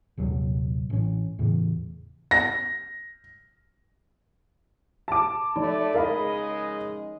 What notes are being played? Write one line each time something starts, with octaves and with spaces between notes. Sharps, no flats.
A#1 D#2 C3 F#3
A1 C#4
E2 A2 C#3 E3
A#6
A5 D6
F3 A3 D#4 D5
C#3 G#3 A#4 D#5 F5 B5